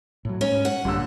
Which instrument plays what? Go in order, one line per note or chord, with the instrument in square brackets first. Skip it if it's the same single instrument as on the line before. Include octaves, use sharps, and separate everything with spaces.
[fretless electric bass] A2 F#3
[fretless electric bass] G#2 [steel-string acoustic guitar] C#4
[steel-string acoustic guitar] F#5
[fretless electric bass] A#1 G2 G3 [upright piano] A#2 D3 E6